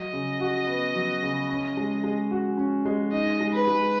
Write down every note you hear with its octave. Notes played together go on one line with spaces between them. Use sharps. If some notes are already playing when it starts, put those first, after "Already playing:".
Already playing: F#3 D#5
C#3
F#4
B3
F#3
C#3
C#4
G#3
G#3
F#4
C#4
G#3
D#4 D#5
G#3
B4
G#3